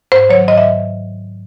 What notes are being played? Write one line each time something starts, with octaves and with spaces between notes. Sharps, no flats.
G#2 C5
D#3 F#3 C#5
G#2 D#5
E5